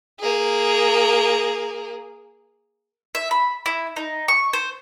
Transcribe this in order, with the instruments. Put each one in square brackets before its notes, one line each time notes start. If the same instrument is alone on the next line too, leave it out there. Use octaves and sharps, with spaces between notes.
[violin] A#3 G#4
[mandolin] E5
B5
E4
D#4
C#6
C5